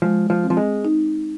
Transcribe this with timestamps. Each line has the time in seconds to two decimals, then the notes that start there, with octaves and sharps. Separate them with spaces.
0.02 F3 G#3
0.30 F3
0.44 C4
0.50 F3
0.57 G#3
0.85 D#4